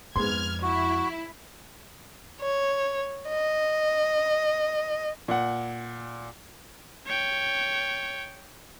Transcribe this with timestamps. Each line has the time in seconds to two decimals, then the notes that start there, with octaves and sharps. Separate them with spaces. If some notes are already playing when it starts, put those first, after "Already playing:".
0.16 F2 G#2 B3 C6 F6 G#6
0.62 E4 F#4
2.40 C#5
3.28 D#5
5.28 A#2 F#5
7.06 C#5 G5